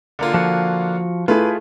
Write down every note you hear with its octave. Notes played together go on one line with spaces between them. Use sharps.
D3 A#3 F4
F3 F#4
A3 E4 F4 G#4 B4